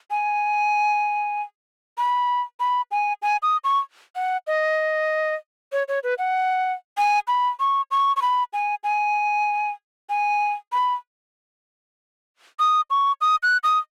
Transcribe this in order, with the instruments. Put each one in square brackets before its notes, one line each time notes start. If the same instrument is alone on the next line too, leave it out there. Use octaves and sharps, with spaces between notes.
[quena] G#5
B5
B5
G#5
G#5
D#6
C#6
F#5
D#5
C#5
C#5
B4
F#5
G#5
B5
C#6
C#6
C#6
B5
G#5
G#5
G#5
B5
D#6
C#6
D#6
F#6
D#6